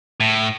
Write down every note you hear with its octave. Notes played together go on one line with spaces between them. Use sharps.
A2